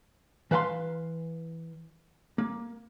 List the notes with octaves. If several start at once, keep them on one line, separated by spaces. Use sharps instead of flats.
E3 B4 F5 A5 C6
A#3